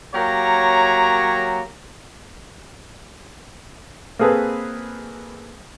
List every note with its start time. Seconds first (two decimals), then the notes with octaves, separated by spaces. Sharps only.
0.14 F#3 A#3 G4 A#4 C#5 A#5
4.19 A#3 C4 G#4 A4 B4